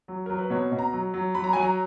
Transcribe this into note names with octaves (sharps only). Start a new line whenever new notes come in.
F#3
F#3 A#4
B4
B2 C#5
B2
A#5
F#3
F#3
F#3 B5
A#5
F#3 G#5
A#5